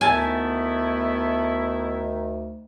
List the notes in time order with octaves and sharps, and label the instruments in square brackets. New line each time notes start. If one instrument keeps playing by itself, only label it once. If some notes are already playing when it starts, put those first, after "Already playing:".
[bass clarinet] D2 [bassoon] D#3 [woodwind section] A3 B3 E4 [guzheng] G#5 A5